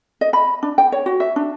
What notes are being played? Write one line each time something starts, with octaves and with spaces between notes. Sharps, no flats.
D#5
B5
D4
G5
C#5
F#4
E5
D4